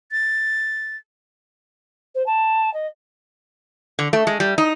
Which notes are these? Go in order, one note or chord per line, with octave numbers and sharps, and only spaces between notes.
A6
C5
A5
D#5
D3
A3
G#3
G3
D#4